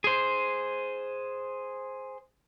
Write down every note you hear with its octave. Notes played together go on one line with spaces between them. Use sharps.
G#4 C5